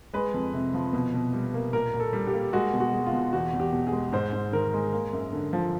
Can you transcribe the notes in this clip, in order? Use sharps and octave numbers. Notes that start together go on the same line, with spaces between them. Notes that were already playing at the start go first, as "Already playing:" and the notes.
G#3 B4
F2
C3
F3
B2
B2
G3
A#3
A#2 A#4
A#2
A4
G3
G4
A#3
G#3 F#4
B2
F#4
G#3
F4
B2
E2 F#4
E2
G4
B2
G#4
G#3
G#2 C5
G#2
D#3 A#4
G#3
A#3
F#2
D3
F3